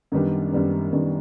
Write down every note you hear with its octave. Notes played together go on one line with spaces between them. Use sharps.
F#2 D#3 G3 B3 D4
F#2 D#3 G3 B3 D4
F#2 D#3 G3 B3 D4